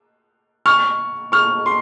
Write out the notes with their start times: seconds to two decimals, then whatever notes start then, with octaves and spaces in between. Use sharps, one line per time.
0.66 C#6 F6
1.32 C#6 F6
1.66 C6